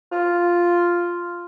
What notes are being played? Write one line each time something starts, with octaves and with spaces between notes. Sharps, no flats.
F4